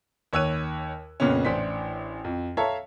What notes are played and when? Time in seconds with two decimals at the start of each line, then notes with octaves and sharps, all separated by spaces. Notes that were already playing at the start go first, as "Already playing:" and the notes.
0.33 D#2 C#5 E6 F#6 D#7
1.20 F2 A#2 C#3 B3 C#4
1.45 A1 D4 C5 B6
2.24 F2
2.57 A4 C#5 E5 F5 A5 A#5